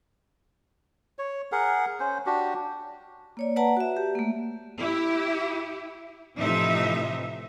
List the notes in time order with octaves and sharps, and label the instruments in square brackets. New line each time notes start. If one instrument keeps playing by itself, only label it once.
[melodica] C#5
G#4 A#4 F#5
C#4 C5
D4 F#4 G4
[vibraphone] A#3 C#5 D5
B4 D5 F#5 A5 A#5
F#4 E5
G4
A3 A#3
[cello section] E4 G4
A2 C3 E3 F3 D#4 E5